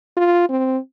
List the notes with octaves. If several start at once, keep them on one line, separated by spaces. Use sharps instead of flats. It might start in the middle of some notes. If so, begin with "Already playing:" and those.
F4
C4